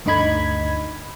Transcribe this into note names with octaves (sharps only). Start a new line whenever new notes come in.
G1 D2 D3 D#4 B5 G#6